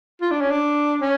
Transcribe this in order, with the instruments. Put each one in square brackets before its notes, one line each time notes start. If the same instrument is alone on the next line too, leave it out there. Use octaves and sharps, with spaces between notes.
[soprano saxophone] F4
D4
C#4
D4
C#4